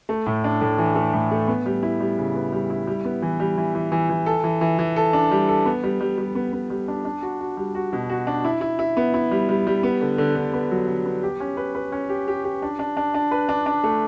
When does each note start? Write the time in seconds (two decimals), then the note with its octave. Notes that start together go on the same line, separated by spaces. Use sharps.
0.09 A3
0.26 A2
0.44 D4
0.61 A2
0.78 E3
0.95 A3
1.13 A2
1.31 A3
1.48 B3
1.66 G3
1.83 E4
2.00 G3
2.18 C#3
2.35 B3
2.52 G3
2.70 E4
2.87 G3
3.05 B3
3.22 E3
3.40 G3
3.57 E3
3.75 E3
3.92 E3
4.09 E3
4.26 A4
4.44 E3
4.61 E3
4.79 E3
4.96 A4
5.13 D4
5.31 G3
5.48 A4
5.66 B3
5.83 G3
6.01 G3
6.18 G3
6.35 B3
6.53 B3
6.70 G3
6.88 D4
7.05 D4
7.22 F#4
7.40 F#4
7.57 G3
7.75 F#4
7.93 B2
8.10 F#4
8.27 D4
8.45 E4
8.61 E4
8.79 E4
8.97 B3
9.14 E4
9.31 G3
9.49 G3
9.67 G3
9.83 B3
10.01 D3
10.18 D3
10.36 D3
10.53 B3
10.71 F#3
10.88 D3
11.05 B3
11.23 G4
11.40 C#4
11.57 B4
11.75 B4
11.92 C#4
12.09 G4
12.28 G4
12.44 G4
12.62 D4
12.79 D4
12.97 D4
13.14 D4
13.31 B4
13.49 D4
13.66 D4
13.84 A3